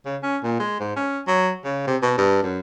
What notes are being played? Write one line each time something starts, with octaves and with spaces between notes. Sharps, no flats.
C#3
C#4
A#2
G#3
G#2
C#4
F#3
C#3
C3
B2
G2
F#2